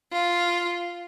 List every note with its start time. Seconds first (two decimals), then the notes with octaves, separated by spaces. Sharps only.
0.12 F4